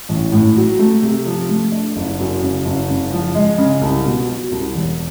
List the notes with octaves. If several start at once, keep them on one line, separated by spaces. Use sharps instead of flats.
A1
A2
F#3
A3
C3
F3
A3
D4
F#1
F#2
C#3
F#1
C#3
F3
G#3
C#3
C2
B2
F#3
C2
E1